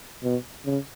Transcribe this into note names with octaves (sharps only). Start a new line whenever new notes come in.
B2
C#3